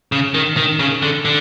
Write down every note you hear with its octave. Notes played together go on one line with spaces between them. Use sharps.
C#3
D#3
D#3
C#3
D3
D3